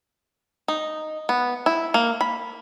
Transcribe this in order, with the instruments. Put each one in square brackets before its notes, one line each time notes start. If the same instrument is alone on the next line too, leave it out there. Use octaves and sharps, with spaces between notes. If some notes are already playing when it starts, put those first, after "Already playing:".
[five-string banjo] D#4
B3
E4
A#3
B5